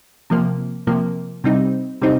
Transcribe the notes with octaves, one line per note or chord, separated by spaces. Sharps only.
C3 F3 A#3
C3 F3 A#3
C3 G3 C4 D#4
C3 G3 C4 D#4